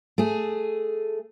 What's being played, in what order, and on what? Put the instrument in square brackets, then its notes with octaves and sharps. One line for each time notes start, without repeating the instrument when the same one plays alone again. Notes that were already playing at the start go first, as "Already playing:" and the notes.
[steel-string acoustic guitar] A3 G#4